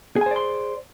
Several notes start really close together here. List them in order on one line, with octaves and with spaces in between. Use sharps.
G#4 G#5 C5 D5 C6